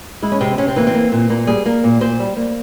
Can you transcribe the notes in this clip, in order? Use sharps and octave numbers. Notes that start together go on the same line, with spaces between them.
G#3 E4
C#4
C3 C4
C3 C#4
C4
E3 A#3
C4
A#3
A#2
A#2 A#3
G3 G#4
A#3 A#4
A#2
A#2 C5
G3
A#3